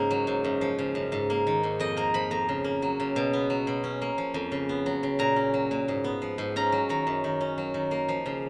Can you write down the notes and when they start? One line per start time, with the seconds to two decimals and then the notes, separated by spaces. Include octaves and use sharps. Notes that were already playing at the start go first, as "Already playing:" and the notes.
Already playing: G#2 C#3 A#3
0.11 F#3
0.27 G#2
0.44 F#2
0.61 F3
0.79 C#3
0.95 F#2
1.12 G#2
1.30 A#3
1.47 D#3
1.63 G#2
1.80 F2 D#5
1.97 A#3 A#5
2.14 F3 B5
2.31 F2 A#5
2.49 C#3
2.64 A#3
2.82 F#3
3.00 C#3
3.16 B2
3.33 B3
3.50 F#3
3.67 B2
3.84 C#4
4.02 A#3
4.18 F3
4.34 F2
4.52 C#3
4.69 B3
4.86 F#3
5.03 C#3
5.19 A#2 A#5
5.36 C#4
5.54 F#3
5.71 A#2
5.88 G#2
6.04 B3
6.22 F3
6.38 G#2
6.56 C#4 A#5
6.72 F#3
6.89 D#3 A#5
7.07 F#2
7.24 D#3
7.41 C#4
7.58 F#3
7.74 D#3
7.91 A#3
8.09 F3
8.26 C#3